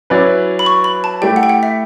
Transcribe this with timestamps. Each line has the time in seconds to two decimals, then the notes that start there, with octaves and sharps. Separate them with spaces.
0.10 F#3 C#4 E4 B4 D5
0.59 B5
0.66 C#6
0.84 B5
1.04 A5
1.21 A3 E4 G4 D5 G5
1.36 F#5
1.43 G5
1.49 F#5
1.63 E5